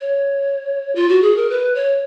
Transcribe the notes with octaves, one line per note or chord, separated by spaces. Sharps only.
C#5
F4
F#4
G#4
A#4
B4
C#5